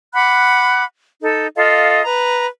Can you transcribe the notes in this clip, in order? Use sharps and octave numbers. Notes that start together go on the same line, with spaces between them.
F#5 B5 D6 F#6
D#4 A4
F4 A4 D#5 F5
B4 A#5